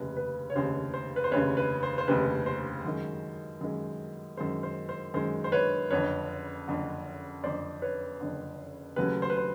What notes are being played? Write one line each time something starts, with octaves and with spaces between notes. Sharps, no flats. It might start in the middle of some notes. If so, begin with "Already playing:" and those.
Already playing: F1 D#2 C#3 B4
B4
C#5
F1 D#2 C#3 C5
C5
B4
C5
F1 D#2 C#3 B4 C#5
B4
C5
C5
F1 D#2 C#3 B4
C5
F#2 D#3 G#3
F#2 D#3 G#3
F#2 D#3 G#3 C5
C5
C5
F#2 D#3 G#3 C5
C5
B4 C#5
F#1 F2 D3 B4 C#5
F#1 F2 D3
F#1 F2 D3 C5 D5
B4 C#5
F#1 F2 D3
D#2 C#3 F#3 A3 C#4 B4
C5
B4
C5